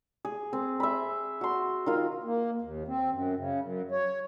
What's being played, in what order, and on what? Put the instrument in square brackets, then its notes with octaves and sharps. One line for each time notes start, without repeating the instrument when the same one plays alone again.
[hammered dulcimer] G#4
C4
E5 B5
F#4 C6
D#3 F4
[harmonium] A#3
D#2
C4
F#2
C#3
F#2
C#5